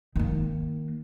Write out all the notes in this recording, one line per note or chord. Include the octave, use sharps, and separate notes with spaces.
D#3 A#3